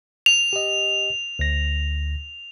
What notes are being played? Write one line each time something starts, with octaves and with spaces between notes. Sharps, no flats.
F7
G4 D#5
D2 A#6